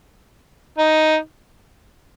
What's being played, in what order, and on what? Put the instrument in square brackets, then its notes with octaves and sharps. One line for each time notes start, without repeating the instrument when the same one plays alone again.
[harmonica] D#4